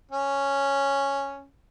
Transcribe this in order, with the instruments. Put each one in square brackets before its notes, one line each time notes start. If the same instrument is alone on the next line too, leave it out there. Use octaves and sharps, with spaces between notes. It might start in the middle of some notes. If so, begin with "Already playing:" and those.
[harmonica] C#4